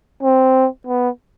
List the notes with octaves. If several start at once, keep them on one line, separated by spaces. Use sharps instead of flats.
C4
B3